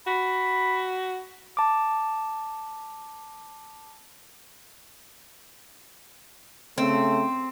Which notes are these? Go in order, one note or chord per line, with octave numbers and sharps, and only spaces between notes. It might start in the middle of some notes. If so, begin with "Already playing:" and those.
F#4 B5
A5 D6
C#3 A3 C4